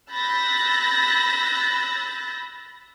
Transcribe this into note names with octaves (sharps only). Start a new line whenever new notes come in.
B5 E6 F#6 G6 A6 A#6